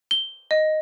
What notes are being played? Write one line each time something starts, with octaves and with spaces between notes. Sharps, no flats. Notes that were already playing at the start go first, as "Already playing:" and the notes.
G7
D#5